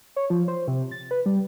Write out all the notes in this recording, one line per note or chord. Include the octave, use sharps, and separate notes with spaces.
C#5
F3
C5
C3
A6
B4
G3